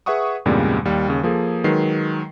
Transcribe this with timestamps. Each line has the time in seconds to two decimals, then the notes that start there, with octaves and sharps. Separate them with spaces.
0.06 G#4 B4 E5 F#5 C#6 D#6
0.45 E2 G2 A#2 C#3 G3 G#3
0.85 D#2 G3
1.08 D#2 C#3
1.23 F3 A#3 G#4 A4
1.64 D#3 F#3 G#3 B4 C7